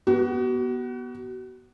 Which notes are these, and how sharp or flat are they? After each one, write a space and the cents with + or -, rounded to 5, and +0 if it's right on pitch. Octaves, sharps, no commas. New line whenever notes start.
B3 -15 F#4 +35